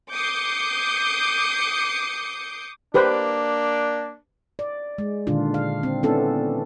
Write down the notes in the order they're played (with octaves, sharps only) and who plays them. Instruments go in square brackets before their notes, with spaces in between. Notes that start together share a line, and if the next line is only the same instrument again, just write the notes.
[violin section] D6 D#6 G6 C7 C#7
[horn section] A#3 D4 [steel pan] G4 B4 C5
[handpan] D5
G#3
A#2 D3 D#3 D4 F4
F5
C4
B3 C#4 D4 E4 A4